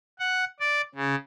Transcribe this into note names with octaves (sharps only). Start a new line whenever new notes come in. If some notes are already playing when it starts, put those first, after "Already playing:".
F#5
D5
C#3